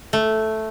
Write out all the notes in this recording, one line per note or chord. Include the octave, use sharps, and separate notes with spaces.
A3